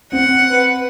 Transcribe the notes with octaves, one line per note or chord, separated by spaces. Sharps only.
C4 F#5
B4